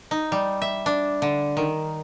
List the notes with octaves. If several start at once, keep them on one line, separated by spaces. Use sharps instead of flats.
D#4
G3
E5
D4
D3
D#3